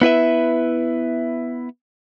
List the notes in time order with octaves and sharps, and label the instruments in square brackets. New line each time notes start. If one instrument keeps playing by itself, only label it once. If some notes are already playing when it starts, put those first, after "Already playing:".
[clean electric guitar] B3 E4 B4 E5